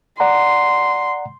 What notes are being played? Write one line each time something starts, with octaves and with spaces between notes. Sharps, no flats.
D5 F#5 A#5 C6